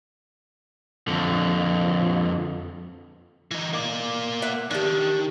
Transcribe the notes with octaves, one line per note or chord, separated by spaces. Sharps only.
F2 D3
E3 D#4
A#3 D5
E5 F#5
D#3 D4 G4